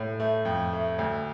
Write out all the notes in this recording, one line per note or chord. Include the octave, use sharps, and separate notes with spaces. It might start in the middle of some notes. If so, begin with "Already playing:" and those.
Already playing: A2
A3
F2
A3
D2